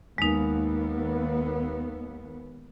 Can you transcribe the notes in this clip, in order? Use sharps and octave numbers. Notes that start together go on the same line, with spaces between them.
D#2 G#3 B3 D#4